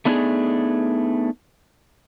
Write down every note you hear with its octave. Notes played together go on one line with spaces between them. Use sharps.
A3 B3 D4 D#4 F#4 G#4